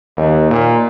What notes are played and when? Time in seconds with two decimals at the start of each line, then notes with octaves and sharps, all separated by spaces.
0.17 D#2
0.50 A#2